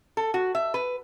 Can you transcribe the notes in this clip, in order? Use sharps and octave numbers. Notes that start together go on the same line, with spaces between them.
A4
F#4
E5
B4